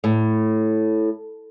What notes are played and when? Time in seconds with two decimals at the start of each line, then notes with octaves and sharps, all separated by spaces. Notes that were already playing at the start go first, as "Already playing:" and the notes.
0.04 A2